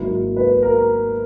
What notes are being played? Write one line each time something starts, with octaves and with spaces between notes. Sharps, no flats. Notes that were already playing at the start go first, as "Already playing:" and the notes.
Already playing: G#1 G#2 F#3 A#3 E4
B4
A#4